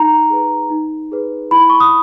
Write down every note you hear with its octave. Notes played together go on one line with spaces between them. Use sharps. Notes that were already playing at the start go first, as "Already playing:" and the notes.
Already playing: D#4 A#5
G#4 B4
D#4
G#4 B4
E4 B5
C#6
D#6